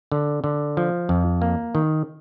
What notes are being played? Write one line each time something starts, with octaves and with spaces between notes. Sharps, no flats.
D3
D3
F3
F2
A#3
D#3